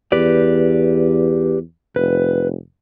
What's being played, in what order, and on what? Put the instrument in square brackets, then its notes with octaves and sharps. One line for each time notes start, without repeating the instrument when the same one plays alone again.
[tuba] E2 [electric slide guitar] G4 B4 D5
[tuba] F1 [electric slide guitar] B4